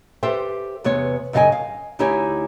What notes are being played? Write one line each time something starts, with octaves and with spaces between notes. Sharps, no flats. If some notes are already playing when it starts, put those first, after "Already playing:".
G4 A4 B4 C5 E5 G5
E2 C3 B3 C#5
F#2 C#3 D#5 F5 G5 G#5
F5
D2 D#4 E4 G4 C#5 G#5